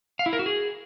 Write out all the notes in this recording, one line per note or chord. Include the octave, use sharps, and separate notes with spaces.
F5
E4
A#4
F#4
G#4